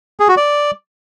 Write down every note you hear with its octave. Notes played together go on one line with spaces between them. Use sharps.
G#4
F#4
D5